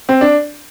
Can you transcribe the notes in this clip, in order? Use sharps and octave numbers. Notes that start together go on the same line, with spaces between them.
C4
D4